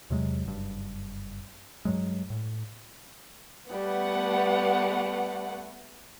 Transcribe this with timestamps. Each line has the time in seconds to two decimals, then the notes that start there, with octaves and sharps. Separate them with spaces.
0.10 E2 C3 F#3 G#3
0.45 F#1 G2
1.85 G2 F#3 G#3
2.30 A2
3.71 G3 A3 B3 F#5